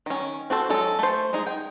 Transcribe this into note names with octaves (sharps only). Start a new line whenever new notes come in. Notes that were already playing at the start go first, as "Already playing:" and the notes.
D#3 C#4
C4 F#4 A4 C5
F#3 G#3 A4
A3 C5
G#3 D#4 G#4
G5